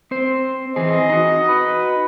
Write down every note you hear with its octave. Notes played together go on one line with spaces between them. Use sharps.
C4 C5
E3 C4 G#4 D#5
D#4 F#4
B4